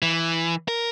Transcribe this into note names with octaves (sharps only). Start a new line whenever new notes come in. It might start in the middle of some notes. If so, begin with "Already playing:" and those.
E3
A#4